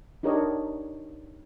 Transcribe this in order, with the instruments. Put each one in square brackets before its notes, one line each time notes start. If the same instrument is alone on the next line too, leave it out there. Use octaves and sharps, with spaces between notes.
[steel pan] D4 D#4 G4 A#4 C#5 D#5